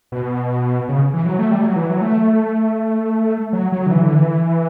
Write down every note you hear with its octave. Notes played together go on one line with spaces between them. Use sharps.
B2
C#3
E3
F#3
A3
G3
F#3
E3
F#3
A3
F#3
F#3
D3
E3
D3
E3